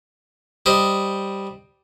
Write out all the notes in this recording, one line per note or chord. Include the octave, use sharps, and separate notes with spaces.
G3 C5 D#5